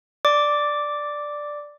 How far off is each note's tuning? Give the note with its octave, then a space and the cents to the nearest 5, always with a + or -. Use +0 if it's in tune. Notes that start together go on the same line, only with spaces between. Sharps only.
D5 +5 D6 -5